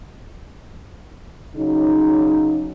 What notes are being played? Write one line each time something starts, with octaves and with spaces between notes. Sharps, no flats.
C#3 F#3 D#4